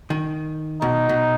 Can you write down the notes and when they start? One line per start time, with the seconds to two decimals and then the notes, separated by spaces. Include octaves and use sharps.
0.10 D#3
0.82 B2 D#4
1.09 B2